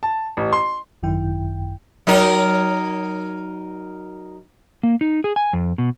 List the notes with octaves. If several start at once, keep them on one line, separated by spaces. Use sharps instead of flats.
A5
A1
C6
G#1 F#2 D#3 E4 G5
F#3 D#4 A#4
A#3
D#4
G#4
G#5
F2
B2